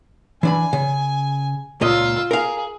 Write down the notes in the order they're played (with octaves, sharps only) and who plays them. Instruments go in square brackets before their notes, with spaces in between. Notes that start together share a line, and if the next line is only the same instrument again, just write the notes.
[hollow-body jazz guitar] E3 D4 B5 [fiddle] G#5
[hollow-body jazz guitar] C#3
[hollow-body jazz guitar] C#2 A#2 D#5 [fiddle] F4 E6
[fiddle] G#4 [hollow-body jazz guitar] A#4 F5